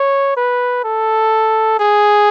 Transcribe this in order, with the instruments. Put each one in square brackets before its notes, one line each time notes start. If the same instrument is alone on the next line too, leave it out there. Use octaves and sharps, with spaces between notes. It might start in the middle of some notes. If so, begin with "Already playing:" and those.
Already playing: [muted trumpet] C#5
B4
A4
G#4